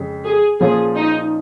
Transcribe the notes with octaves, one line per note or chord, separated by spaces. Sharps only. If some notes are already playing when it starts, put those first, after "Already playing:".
Already playing: F2 C#3 G#3
G#4
A#2 F3 C#4 F4 G#4
D#4